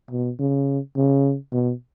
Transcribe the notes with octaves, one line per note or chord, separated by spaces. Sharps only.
B2
C#3
C#3
B2